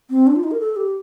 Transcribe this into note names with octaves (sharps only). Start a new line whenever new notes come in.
C4
D4
F4
D#4
A#4
A4
G4